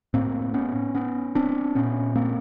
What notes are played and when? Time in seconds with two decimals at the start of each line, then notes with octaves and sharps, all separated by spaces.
0.14 A2 A#3 C4
0.54 B3 C#4
0.95 B3 C#4
1.35 C4 D4
1.75 A#2 B3 C#4
2.16 A#3 C4